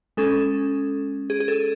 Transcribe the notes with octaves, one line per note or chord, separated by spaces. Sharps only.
G#3 C#4 A4
G#4
G#4
A4